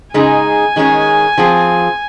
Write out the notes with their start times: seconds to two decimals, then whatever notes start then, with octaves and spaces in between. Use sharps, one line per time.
0.14 C#3 G#3 D#4 G#4 G#5
0.76 D#3 G#3 C#4 G#4
1.38 F3 C4 F4 G#4